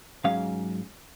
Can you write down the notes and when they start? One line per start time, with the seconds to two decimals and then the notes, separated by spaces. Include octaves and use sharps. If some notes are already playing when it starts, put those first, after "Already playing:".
0.24 G#2 F#3 C#4 F5